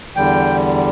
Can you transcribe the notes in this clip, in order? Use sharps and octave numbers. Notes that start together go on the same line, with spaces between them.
E2 D3 G3 G5